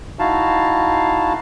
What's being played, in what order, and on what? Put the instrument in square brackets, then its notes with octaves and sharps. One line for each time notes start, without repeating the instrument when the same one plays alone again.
[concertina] D#4 E4 F#4 F5 A5